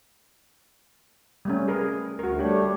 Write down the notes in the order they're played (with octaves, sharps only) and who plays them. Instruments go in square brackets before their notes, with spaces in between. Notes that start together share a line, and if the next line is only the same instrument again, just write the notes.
[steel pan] G3 A3 C#4
G#4 A#4 B4
[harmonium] D2 [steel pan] F#4 A#4
[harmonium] G3 A3 D4 [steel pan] G4 C#5